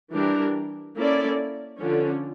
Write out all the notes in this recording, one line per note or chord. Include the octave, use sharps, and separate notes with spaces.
E3 G3 D4 G4 A#4
A#3 C#4 E4 A4 D5
D3 F3 C#4